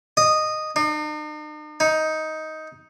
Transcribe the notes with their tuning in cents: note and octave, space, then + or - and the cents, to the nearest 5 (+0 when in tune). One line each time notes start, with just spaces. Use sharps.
D#5 -10
D#4 -45
D#4 +10